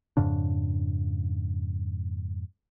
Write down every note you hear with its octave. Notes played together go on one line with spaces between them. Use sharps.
F2 G#2 C#3 D4